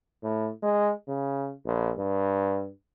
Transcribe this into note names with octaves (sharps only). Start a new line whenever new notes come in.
A2
G#3
C#3
A#1
G2